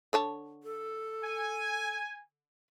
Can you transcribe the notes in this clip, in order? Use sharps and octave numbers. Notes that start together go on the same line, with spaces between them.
D3 C#5 A5
A4
G#5